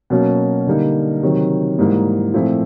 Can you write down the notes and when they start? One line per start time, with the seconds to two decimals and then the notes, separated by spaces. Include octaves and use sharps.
0.10 B2 F#3 A#3 C#4
0.67 D3 G3 A#3 D#4
1.22 C3 D#3 F#3
1.79 G#2 E3 G3 A#3
2.34 A#2 F3 A3 C4 E4